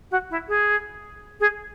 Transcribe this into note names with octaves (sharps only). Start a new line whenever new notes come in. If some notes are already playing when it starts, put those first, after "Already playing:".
F#4
E4
G#4
G#4